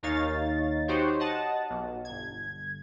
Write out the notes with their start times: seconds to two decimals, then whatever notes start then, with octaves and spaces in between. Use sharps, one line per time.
0.03 D#2 D#4 C#5 F5 A6
0.88 D#4 F#4 G4 C5 C#5
1.20 D#5 F#5 A5
1.70 B1
2.05 G1 G#6